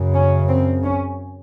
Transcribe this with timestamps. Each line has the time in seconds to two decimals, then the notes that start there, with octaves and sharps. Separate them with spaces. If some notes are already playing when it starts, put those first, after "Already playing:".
Already playing: F#2 C#3
0.15 C#4
0.49 C4
0.83 C#4